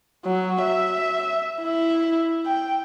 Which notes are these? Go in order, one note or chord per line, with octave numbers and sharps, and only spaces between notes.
F#3
E5
E4
G5